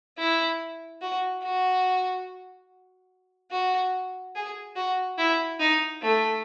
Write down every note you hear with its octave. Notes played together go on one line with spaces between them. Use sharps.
E4
F#4
F#4
F#4
G#4
F#4
E4
D#4
A3